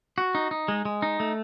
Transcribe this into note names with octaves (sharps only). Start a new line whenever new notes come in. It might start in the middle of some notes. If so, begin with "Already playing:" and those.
F#4
D#4
D#4
G#3
G#3
D#4
A3